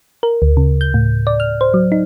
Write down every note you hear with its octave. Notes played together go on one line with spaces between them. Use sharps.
A#4
D2
C#3
G6
A2
D5
F6
C5
F#3
D#4